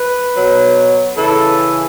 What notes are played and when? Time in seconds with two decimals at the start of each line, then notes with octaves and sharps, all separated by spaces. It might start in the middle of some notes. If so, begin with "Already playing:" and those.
Already playing: B4
0.34 B2 F#3
1.16 C#3 E3 A4
1.58 G#4